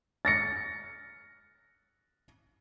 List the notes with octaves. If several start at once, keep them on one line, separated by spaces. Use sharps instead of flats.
A6 A#6 C#7